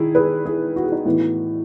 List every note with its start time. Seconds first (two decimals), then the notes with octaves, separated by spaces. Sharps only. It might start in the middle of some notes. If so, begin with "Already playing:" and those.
Already playing: D#3 E4 G#4
0.15 G#4 B4
0.45 E4 G#4
0.76 F#4
0.83 G#4
0.92 D#4 F#4
1.05 A2 E3 B3